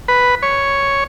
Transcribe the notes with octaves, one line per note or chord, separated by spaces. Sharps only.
B4
C#5